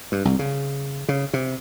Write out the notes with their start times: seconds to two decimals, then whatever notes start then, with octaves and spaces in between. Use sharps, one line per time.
0.12 G2
0.25 C2
0.39 C#3
1.09 C#3
1.33 C3